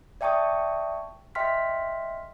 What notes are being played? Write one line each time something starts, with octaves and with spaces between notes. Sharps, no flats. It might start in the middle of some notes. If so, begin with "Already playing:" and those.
D5 E5 G5 A5 C#6 D#6
D#5 E5 G5 C6 F6 B6